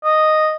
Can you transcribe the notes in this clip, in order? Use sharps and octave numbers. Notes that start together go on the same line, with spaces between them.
D#5